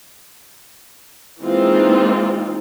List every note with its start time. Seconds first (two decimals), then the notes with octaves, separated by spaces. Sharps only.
1.42 E3 G#3 A#3 C4 D#4 F4